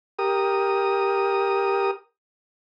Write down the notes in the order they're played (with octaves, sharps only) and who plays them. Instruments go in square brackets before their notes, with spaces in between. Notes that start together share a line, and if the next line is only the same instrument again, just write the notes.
[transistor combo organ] G4 A#4 D#6